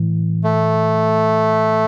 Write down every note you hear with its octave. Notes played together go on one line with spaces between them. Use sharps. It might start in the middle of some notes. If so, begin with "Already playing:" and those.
Already playing: A2 E3
A3